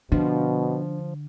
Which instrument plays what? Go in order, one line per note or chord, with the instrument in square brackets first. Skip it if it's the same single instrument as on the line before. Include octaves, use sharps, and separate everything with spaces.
[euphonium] B2 [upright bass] D3 [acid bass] F3 [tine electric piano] D4